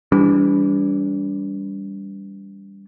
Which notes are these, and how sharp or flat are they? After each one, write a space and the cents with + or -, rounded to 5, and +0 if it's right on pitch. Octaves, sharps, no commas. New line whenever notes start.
E3 +0 G3 +10 D4 -35